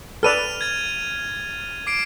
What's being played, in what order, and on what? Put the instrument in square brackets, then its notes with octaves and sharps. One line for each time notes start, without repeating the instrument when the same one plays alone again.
[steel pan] A4 B4 D5 [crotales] F6 D#7 F7
[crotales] G#6 A6
D6 C7 D7